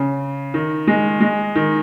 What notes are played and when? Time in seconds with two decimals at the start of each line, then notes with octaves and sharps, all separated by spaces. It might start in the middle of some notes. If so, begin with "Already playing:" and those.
Already playing: C#3
0.54 D#3
0.87 G#3
1.20 G#3
1.55 D#3